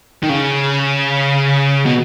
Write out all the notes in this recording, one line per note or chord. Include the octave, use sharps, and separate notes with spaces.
D#3
C#3
B2